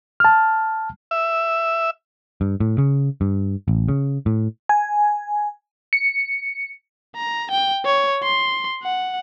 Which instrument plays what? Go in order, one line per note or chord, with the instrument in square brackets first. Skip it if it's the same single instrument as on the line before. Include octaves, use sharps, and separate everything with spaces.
[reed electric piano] A5 F6
[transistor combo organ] E5
[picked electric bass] G2
A2
C#3
G2
A1
C#3
A2
[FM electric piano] G#5
C#7
[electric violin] A#5
G5
C#5
C6
F#5